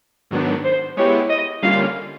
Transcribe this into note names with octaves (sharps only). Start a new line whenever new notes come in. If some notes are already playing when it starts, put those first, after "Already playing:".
G#2 D#3 F#3 B3 D4
C5
G#3 B3 E4 G4 C#5
D#5
D3 G3 A#3 C#4 F4 F5